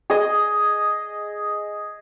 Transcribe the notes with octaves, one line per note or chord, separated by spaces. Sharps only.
G#4 D#5